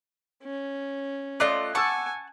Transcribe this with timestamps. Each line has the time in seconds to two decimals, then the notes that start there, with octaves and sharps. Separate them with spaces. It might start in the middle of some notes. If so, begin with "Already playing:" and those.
0.43 C#4
1.40 A3 F4 D5 D#5 D6 F#6
1.75 F#5 G#5 A5 C#6 D6 E6